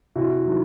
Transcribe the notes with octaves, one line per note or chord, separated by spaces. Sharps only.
C3 E4 F#4
D#3 F#3